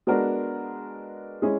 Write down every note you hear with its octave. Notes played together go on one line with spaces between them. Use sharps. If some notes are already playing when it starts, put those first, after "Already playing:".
G#3 B3 D4 F#4 A#4
G#3 C#4 E4 G#4